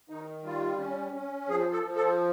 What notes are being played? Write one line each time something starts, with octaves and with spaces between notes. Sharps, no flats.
D#3 D#4
G3 F4
C#4
C#4
F3 G#4
A4
F3
A4